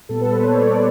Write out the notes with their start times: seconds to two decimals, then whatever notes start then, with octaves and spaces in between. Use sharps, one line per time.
0.09 A#2 G3 B3 A4
0.21 B4
0.32 C5
0.44 C#5
0.56 D5